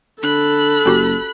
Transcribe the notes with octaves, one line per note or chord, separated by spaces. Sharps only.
D3 A4 B5 F#6
F#1 C#4 F#4 G4